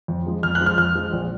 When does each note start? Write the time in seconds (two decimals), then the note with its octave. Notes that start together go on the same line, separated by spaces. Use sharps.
0.08 F2
0.26 F3 G#3
0.43 F2 F6
0.55 F#6
0.61 F3 G#3
0.66 F6
0.78 F2 F6
0.95 F3 G#3
1.13 A#1